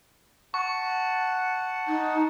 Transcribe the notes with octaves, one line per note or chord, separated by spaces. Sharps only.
F#5 A5 C#6
D#4